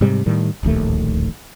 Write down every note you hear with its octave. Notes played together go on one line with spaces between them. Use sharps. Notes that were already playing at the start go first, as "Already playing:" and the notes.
G#2 C3 G3
A2 D#3 G3
D1 A#1 D#2 A3